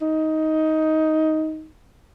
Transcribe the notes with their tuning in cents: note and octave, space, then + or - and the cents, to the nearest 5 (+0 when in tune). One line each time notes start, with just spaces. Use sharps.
D#4 +10